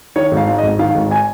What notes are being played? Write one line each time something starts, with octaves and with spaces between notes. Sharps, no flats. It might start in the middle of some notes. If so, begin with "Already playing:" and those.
D#3 C#5
G#1
F5
G#2
D#5
G#1
D#3 F5
G#1
G#5